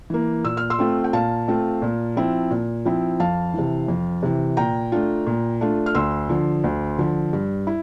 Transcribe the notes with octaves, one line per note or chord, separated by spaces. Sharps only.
E3 A#3
A#2 E6
F6
C6 E6
A3 C4 F4
G5
A#2 F5 A5
A3 C4 F4
A#2
F3 C4 E4
A#2
F3 C4 E4
F2 F5 A5
C3 E3
F2
C3 E3
A#2 G5 A#5
A3 D4 F4
A#2
A3 D4 F4
F6
D2 C6 E6
D3 F3
D2
D3 F3
G2
E4